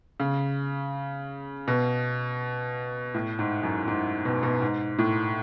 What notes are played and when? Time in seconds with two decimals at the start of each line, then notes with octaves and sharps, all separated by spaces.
0.20 C#3
1.68 B2
3.14 A2
3.39 G#2
3.63 F#2
3.88 G#2
4.25 B2
4.43 B2
4.62 G#2
4.99 A2